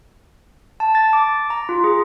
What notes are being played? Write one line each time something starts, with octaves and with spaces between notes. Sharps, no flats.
A5
A6
D6
A#5
F4
G#4